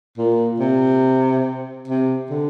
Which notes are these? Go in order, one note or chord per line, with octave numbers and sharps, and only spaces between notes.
A#2
C3
C3
D3